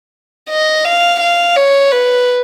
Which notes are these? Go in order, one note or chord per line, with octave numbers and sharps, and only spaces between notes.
D#5
F5
F5
C#5
B4